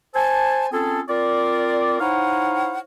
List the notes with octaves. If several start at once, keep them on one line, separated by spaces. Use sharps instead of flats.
C5 G#5 A5
C4 C#4 F4 G#4 A4
C4 F4 A#4 D5
D#4 E4 C5 C#5 F5 F#5